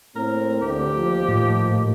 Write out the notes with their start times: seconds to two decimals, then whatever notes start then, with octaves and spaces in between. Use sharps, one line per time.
0.16 A2 A#3 C4 A#4
0.62 D2 G4
0.97 D#2 D#3 F3
1.29 A2